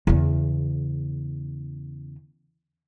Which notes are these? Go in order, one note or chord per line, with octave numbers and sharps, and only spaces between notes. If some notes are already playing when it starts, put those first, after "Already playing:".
E2 C#3